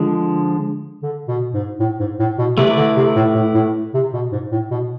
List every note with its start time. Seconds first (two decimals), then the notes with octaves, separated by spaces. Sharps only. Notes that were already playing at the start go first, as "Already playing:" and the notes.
Already playing: D3 F3 G#3
1.03 D3
1.28 B2
1.54 G#2
1.80 A2
2.00 G#2
2.19 A2
2.39 B2
2.58 C3 A3 E4 B4 D5
2.77 D3
2.97 C3
3.16 A2
3.35 A2
3.54 A2
3.94 C3
4.13 B2
4.32 G#2
4.52 A2
4.71 B2